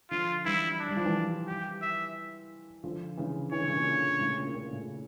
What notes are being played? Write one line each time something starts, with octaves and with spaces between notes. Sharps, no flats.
D3 F3 F4
E3 G3 E4
D4
G3
F3
E3 G3
G4
E5
D3 F3
C#3 E3
E3 C#5
D3
C#3
A#2 D3
A2 C#3
A#2
C#3
A#2
A2 C#3